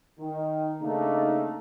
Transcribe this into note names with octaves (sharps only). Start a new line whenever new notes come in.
D#3
C#3 A3 A#3 D4 D#4